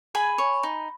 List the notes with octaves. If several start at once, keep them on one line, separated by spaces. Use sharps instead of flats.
G#4 G#5 B5
C#5
D#4